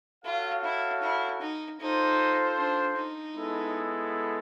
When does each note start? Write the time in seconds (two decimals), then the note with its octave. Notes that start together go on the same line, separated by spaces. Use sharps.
0.25 F4 F#4 A4 C#5 F5
0.64 E4
1.02 E4
1.41 D#4
1.80 D#4 F4 A4 C5
2.58 D4
2.97 D#4
3.35 G#3 B3 E4 A4